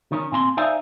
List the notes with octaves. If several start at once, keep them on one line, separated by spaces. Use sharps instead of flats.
D#3 C#4
A#2 C4 G#5 C6
D#4 C5 D5 E5 F5 G#5